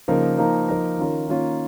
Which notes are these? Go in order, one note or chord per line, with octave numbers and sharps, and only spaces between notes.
C#3 F3 A#3 D#4 A#4
F3 A#3 D#4 A#4
F3 A#3 D#4 A#4
D#3 C#4 F4 A#4
D#3 A#3 C#4 F4